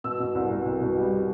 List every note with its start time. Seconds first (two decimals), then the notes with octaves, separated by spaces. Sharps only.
0.04 B2 E6
0.20 B2
0.35 C2
0.50 B2
0.66 C2
0.81 B2
0.97 G3